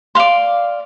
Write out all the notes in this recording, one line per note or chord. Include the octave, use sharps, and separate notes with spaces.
D5 F5 C6